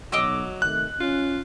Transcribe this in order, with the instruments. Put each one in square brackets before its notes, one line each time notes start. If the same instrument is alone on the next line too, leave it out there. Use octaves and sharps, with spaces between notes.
[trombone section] B1 [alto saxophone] F#3 [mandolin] D#5 D6 E6
[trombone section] C3 D#3 A3 [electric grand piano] F#6
[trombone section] C#4 [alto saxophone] F4